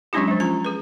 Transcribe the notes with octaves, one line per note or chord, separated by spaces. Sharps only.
F#3 G#3 C#4 D4 E4 G4
F3 G#3
C#4 F4 A#5
G#4 B4